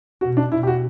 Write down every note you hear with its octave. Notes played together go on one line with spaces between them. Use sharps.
B2 F#4
D4
B2 E4
G4
F#4